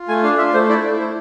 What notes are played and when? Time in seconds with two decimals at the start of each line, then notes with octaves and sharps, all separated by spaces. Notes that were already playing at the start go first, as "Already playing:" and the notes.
Already playing: F4
0.08 A3 G#5
0.23 D4 F5
0.38 F4 E5
0.54 A3 C5
0.69 E4 D5
0.84 A3
1.00 A3 C5